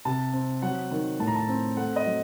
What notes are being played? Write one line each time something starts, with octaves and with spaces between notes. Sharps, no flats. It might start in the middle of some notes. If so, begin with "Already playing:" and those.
C3 A5
C4
F#3 F#5
D#3
A2 A5
A#5
A5
C4
A3 F#5
D#5
F#3